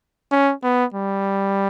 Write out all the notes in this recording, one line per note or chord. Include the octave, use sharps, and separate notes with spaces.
C#4
B3
G3